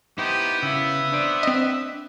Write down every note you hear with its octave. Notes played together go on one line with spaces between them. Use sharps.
B3 D#4 E4 G4 C5
C#3 E4 E5
D4 C5 D5
C4 D#5